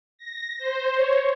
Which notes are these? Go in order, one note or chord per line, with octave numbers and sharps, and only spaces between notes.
A#6
C5
C#5